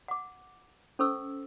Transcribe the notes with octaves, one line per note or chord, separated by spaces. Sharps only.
F#5 D6
C#4 A4 C5 C#6 E6